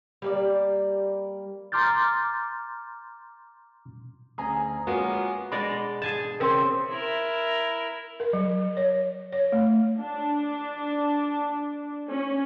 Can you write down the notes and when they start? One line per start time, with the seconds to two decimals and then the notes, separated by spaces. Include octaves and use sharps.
0.22 G3 A#3 D5
1.72 A#5 C6 D6 F6 G6 A6
4.38 D2 C#4 G#4 G#5 A#5 D#6
4.87 G#3 A#3 B3 C#4 F4 F#4
5.52 B2 G#3 D5 B5
6.02 G#4 G#5 A5
6.40 C#3 C4 A#4 G5 C6
6.89 E4 A#4
8.20 A#4
8.33 F#3
8.77 C#5
9.32 C#5
9.52 A3
9.99 D4
12.09 C#4